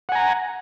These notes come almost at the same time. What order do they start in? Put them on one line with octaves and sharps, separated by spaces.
F#5 G#5 A#5